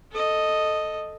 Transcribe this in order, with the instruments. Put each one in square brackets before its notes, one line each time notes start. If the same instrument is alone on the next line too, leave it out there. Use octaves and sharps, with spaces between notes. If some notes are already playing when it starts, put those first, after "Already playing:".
[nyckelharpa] A4 D#5